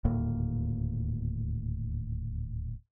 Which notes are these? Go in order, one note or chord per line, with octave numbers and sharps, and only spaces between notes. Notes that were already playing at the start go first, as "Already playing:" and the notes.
D#1 D2 A2 A#3